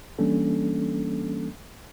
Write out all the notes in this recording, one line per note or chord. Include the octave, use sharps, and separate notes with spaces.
E3 G3 A#3 C#4 D4 A4